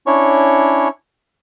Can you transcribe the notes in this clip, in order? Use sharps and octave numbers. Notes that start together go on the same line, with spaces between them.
C#4 D4 E4 C#5 C#6